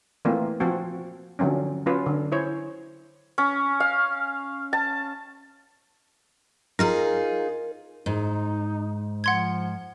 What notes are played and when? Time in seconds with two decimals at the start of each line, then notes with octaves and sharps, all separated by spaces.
0.25 E3 A3 A#3 C4 F4
0.60 F3 C4 F#4
1.39 D3 F3 F#3 C4 C#4
1.86 F#3 C#4 F4 B4
2.06 D3
2.32 E4 C5 C#5
3.38 C#4
3.80 F5
4.73 A5
6.79 D#4 F4 G#4 A#4
8.06 G#2 D#4
9.24 F3 F#5 C6 G#6